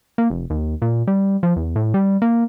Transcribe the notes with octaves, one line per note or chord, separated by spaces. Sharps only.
A#3
F1
D#2
A#2
G3
F3
E2
A2
G3
A#3